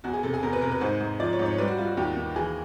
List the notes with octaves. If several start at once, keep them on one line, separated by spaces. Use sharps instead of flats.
E2 F#4
G#4
C3 A4
G#4
E2 A#4
B4
C3 A#4
B4
G#2 C5
G#2
F3 D5
C#5
G#2
C#5
G3 B4
F#4
G3 F4
F#4
D#2 G4
D#2
E3 G#4